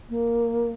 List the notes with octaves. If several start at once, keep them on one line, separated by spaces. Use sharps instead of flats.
A#3